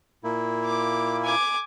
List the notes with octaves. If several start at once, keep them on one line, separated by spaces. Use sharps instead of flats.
A#2 A#3 E4
D6
G#5 D6